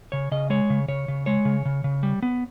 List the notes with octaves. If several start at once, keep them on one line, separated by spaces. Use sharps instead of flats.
C#3 C#5
C#3 D#5
G#3 C#5
C#3
C#3 C#5
C#3
G#3 C#5
C#3
C#3
C#3
G3
B3